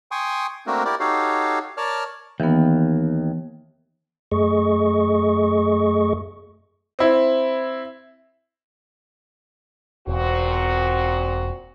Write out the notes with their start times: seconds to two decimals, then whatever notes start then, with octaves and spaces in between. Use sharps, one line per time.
0.11 G5 G#5 C6 C#6 D#6
0.67 A3 A#3 C4 D4 F#4 A#4
0.85 E4 G4 A#4 D5
1.00 D#4 F#4 G4 A4 C#5 F5
1.77 A#4 C#5 D5 A5 F6
2.40 D#2 E3 B3
4.32 F#2 A3 G#4 D#5 C#6
6.99 C4 E4
10.07 E1 A#2 C4 F#4